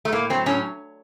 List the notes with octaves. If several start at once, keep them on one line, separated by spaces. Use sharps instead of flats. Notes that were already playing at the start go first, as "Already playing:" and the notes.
A3
A2 A#3
F#3 C4
A2 C#4